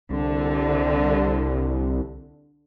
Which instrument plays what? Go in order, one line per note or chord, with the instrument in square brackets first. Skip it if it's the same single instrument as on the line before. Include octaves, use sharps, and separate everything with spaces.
[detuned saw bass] C2 [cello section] D3